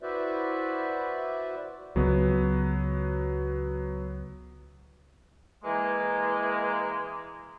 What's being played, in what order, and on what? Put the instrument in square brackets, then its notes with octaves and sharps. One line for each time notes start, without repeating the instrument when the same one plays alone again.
[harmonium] E4 F#4 B4 C5 D5 E5
[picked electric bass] C#2 [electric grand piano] F#3 B3
[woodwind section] E3 G#3 A#3